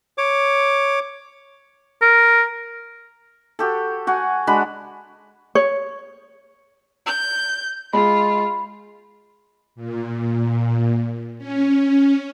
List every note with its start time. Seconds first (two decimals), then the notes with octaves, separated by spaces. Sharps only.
0.18 C#5 D6
2.02 A#4
3.59 F#4 G4 A4
4.07 F#4 F#5 G#5
4.47 G#3 D4 F#4 B5
5.55 C#5
7.06 G6
7.93 G#3 F4 B5
9.75 A#2
11.38 C#4